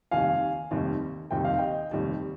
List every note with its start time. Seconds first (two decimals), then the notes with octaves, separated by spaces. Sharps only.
0.11 F1 D#2 D#3 G3 F5 G#5
0.71 F1 D#2 D#3 G3
1.31 F1 D#2 D#3 G3 G5
1.45 F5
1.58 D#5 G5
1.91 F1 D#2 D#3 G3